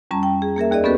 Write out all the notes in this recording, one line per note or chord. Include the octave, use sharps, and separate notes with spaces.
F2 G3 C#4 A5 A#5
G5
G#4
A#3 G#4 A#4 E5
D#2 G#4 D5 D#5
B3 C#4 F#4 G4 A4 B4